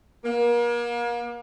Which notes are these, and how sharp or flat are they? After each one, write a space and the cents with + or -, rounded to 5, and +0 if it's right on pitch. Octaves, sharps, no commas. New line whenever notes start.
A#3 +35